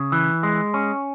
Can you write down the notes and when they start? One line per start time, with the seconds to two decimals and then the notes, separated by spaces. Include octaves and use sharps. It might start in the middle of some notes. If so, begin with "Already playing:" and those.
Already playing: C#3
0.12 E3
0.43 G#3
0.74 C#4